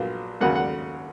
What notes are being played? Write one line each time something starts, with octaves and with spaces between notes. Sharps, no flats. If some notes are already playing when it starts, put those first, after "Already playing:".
Already playing: A#1 A#2 F#3 B3 F5
D#2 C#3 F#3 A#3 F#5
F#5